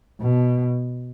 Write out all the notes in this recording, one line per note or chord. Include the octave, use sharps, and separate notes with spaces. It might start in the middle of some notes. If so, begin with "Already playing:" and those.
B2